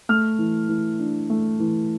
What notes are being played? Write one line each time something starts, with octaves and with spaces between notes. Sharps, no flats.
A3 F6
E3
E3
D4
A3
E3